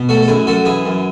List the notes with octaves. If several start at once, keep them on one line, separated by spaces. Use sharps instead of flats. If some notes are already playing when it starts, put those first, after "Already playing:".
Already playing: B2
A3 F#4 A4
A4
F#2 E4 G#4
F#2 F#4 A4
E3 E4 G#4
F#2